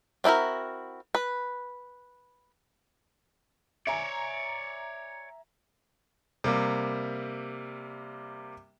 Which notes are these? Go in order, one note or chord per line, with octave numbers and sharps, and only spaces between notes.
C4 D4 E4 F#4 A#4
B4
C#5 D5 E5 G#5 A#5
C3 G3 A#3